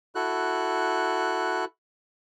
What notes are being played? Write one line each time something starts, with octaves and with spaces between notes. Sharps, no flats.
E4 F#4 A4 F#6